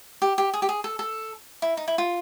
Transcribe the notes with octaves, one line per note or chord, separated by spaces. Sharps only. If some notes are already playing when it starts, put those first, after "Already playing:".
G4
G4
G#4
G4
G#4
A4
A4
E4
D#4
E4
F4